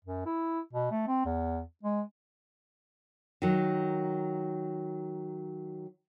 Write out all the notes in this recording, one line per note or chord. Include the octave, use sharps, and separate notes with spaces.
F#2
E4
B2
A3
C4
E2
G#3
D#3 F#3